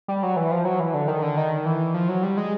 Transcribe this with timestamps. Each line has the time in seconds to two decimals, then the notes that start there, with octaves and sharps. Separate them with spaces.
0.08 G3
0.23 F#3
0.37 E3
0.51 F3
0.65 F#3
0.80 E3
0.94 D3
1.08 D#3
1.22 D3
1.37 D#3
1.65 E3
1.94 F3
2.09 F#3
2.23 G3
2.37 G#3